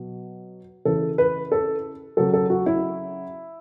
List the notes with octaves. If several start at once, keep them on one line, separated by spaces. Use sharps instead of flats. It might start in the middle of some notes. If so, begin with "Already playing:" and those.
Already playing: B2 F#3
C#3 E3 A4
B4
A4
C#3 F#3 A4
A4
F#4
E4